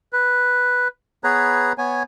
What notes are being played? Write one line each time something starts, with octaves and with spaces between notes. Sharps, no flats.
B4
B3 G#4 B4 C#5 A#5
B3 C#5 G#5